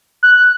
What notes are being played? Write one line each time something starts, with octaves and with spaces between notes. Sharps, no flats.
F#6